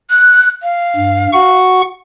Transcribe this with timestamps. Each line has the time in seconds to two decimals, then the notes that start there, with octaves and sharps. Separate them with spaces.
0.10 F#6
0.63 F5
0.97 G2
1.33 F#4 F#5 C#6